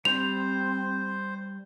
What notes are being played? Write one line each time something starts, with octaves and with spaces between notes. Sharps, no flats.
G3 C4 C5 G5 F7